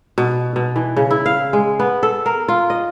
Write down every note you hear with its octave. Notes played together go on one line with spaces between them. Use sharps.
B2
B2
E3
C#3
E4
F5
G#3
B3
A4
A#4
F4
D#5